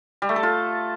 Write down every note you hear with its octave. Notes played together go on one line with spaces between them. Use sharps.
G3
A3
A4
F4